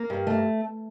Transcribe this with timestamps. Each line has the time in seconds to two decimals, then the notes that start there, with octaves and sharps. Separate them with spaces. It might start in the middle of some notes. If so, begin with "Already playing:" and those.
Already playing: A#3
0.10 G2
0.27 A3